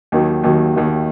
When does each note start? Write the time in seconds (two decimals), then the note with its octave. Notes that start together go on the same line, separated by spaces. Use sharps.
0.12 D#2 D#3 F#3
0.43 D#2 D#3 F#3
0.74 D#2 D#3 F#3